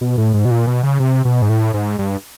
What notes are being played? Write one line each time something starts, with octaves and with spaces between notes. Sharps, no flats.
B2
A2
G#2
B2
A#2
B2
C#3
C3
B2
G#2
A2
G#2
G2